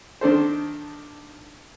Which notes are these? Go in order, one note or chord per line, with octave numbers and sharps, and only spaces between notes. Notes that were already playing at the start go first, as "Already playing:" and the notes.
D#3 D4 A4 C5